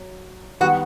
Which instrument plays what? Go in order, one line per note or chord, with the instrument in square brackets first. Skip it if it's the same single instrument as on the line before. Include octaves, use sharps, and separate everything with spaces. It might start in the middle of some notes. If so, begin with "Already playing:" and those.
Already playing: [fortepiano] F#3
[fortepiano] D#3 G3 B3 [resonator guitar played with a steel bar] F#4